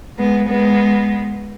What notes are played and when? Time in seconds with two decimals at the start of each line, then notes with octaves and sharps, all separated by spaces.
0.18 G#3 B3
0.49 G#3 B3